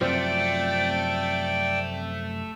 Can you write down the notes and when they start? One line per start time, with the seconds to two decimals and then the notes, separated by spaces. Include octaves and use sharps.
0.01 F#2 C3 F3 A3 C4 D5 G5